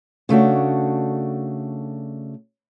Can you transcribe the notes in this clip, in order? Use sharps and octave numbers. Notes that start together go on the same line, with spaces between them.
C#3 A3 D4 F#4